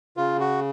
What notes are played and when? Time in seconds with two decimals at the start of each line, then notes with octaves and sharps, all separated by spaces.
0.17 C#3 F4
0.40 F#4